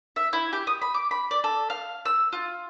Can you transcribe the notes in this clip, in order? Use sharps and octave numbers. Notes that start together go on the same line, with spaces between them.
E5
E4
G4
D#6
B5
D6
B5
D5
A4
F5
E6
F4